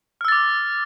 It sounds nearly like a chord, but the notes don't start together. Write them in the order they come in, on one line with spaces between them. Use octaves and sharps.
F6 E6 A6 D6